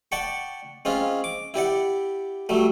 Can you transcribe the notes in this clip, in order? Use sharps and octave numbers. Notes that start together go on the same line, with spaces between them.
D5 F#5 G5 A5 C#6
G#3 C4 C#4 F4
D6
E4 G4 D5 F#5
F#3 G3 A3